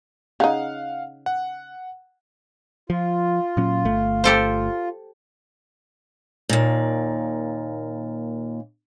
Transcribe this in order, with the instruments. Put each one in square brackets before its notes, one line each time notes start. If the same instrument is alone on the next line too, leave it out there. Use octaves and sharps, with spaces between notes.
[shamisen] C#3 D#4 [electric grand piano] F5 F#5
[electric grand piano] F#5
[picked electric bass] F3 [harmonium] F4
[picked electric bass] A#2 F#3 C#4
G1 A3
[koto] G4 A4 C5
[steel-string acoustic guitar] D#2 A#2